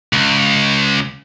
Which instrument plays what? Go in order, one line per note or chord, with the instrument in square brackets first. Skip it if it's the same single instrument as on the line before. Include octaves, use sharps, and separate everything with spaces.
[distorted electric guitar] C#2